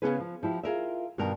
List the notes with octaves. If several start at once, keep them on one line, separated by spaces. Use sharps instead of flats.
C#3 G#3 B3 C#4 G#4 B4
F3
F3 E4 G4
F4 G#4 A#4 E5
G2 B2 D#3 G3 A#4